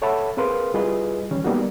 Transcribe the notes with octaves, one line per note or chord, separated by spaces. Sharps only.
A4 C#5 E5 F#5 A5 B5
C4 G#4 A#4 B4 F5 C6
G3 E4 F4 G#4 B4 D#5
D#3 E3 G3 C#4
G3 A#3 B3 D#4 F#4